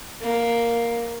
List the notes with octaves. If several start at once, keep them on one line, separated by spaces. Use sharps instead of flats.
A#3